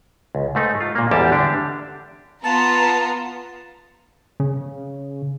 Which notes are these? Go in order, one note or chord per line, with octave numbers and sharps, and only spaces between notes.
C#2
G#2 A3 D#4
F4
A#2 A#3
A1 E2 G#2 G3 G4 A5
D3 D4 G4
B3 F4 A5 A#5
C#3